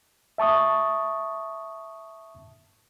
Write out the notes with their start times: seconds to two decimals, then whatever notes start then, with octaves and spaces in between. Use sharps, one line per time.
0.38 E5 A5 C#6 D#6